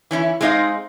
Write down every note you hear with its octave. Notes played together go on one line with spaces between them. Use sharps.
E3 C#4 D#4 E4
G#3 A3 C4 D#4 D#5 F5